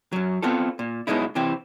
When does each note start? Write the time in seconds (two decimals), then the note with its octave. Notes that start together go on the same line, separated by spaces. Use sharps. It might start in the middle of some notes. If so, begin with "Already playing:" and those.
0.13 F#2 F#3
0.42 B3 C4 F4 A4
0.79 A#2
1.07 F#2 B2 F#3 G#3 D#4 E4
1.35 C3 E3 C4 G4